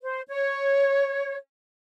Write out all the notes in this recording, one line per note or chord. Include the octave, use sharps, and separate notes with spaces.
C5
C#5